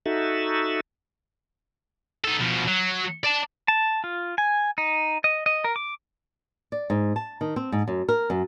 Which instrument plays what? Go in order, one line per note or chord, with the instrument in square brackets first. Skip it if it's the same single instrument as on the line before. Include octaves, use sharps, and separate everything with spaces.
[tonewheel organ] D#4 F#4 A4 E5
[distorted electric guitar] D#4 A4
B2 F3
F#3
D5 A5
[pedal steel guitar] A5
F4
G#5
D#4
D#5
D#5
A#4
D6
[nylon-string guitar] D5
G#2
A5
D#3
C4
G#2
F#2
A#4
F#2